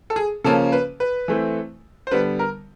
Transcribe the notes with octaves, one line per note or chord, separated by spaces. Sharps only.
A4
G#4
C#3 F3 A#3 C#4 A4
B4
B4
E3 A3 C4
C5
D3 G3 B3 B4
A#4